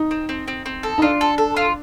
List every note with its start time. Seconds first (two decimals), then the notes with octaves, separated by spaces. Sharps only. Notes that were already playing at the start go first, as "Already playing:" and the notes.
Already playing: D#4
0.11 C4
0.29 C4
0.48 C4
0.66 C4
0.83 A4
0.98 D#4
1.02 D4 F4
1.21 A4
1.38 A4
1.57 F4